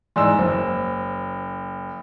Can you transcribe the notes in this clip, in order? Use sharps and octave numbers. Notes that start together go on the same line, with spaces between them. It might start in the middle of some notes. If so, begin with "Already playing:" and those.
E2 G#2 D5 G#5 C6 E6
F#1 C5